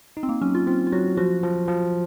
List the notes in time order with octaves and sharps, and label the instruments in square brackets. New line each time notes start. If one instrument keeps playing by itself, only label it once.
[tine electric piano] D#4
[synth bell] C4
A#3
[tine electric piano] F#3 [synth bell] C#4
[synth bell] F4
[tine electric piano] C4 [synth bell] F4
[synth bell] F4
[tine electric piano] F#3 [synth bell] F#4
[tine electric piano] F3 [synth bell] F#4
[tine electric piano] F3
F3